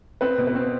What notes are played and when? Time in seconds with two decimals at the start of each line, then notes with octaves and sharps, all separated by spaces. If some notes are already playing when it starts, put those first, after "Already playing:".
0.21 C4 B4
0.38 B2
0.47 B4
0.55 C4